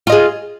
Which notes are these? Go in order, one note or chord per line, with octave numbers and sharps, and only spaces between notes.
F4 G#4 D#5